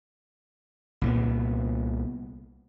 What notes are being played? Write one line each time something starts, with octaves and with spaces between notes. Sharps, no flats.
C2 A#2 B3